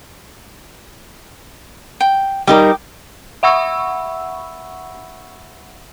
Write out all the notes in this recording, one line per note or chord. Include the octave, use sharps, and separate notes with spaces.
G5
G3 D#4 A#4 G5 D6
E5 F#5 B5 C#6 E6